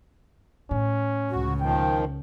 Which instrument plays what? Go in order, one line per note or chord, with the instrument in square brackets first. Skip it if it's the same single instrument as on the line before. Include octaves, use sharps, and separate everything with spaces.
[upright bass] A2 [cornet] C#4
[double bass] C#2 C#3 [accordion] F#4
[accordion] D#3 F3 [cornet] G5